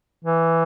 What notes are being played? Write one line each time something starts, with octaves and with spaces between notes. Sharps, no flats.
E3